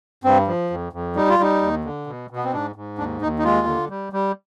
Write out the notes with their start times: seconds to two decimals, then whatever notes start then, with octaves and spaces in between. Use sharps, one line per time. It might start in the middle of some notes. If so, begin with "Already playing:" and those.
0.24 G2 C4
0.47 F3
0.70 F2
0.93 F2
1.16 G3 D#4
1.29 F4
1.39 G3 D#4
1.62 D#2
1.84 D3
2.07 B2
2.30 B2
2.36 B3
2.44 C4
2.53 G#2 D4
2.76 G#2
2.98 D#2 D4
3.21 D#2 D#4
3.39 D#4
3.44 G#3 F4
3.67 D3
3.90 G3
4.13 G3